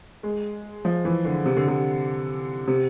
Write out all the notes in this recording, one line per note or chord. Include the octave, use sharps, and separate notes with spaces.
G#3
F3
E3
D3
C3
D3
C3
C3